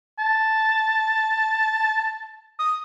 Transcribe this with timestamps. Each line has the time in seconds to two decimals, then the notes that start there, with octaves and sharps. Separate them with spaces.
0.19 A5
2.59 D#6